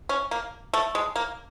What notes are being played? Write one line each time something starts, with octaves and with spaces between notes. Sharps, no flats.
C#4
A#3
A3
G#3
A#3